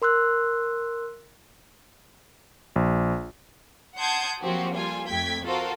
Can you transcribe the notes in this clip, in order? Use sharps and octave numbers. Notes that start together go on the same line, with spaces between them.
A#4 C6 E6 F#6
A#1
F#5 A5 C6 D#6 G6 G#6
F3 F#3 A#3 C4 F#4 G4
G3 F4 A4 G#5
F2 A3 G5 G#6 B6
F4 F#4 A4 A#4 C5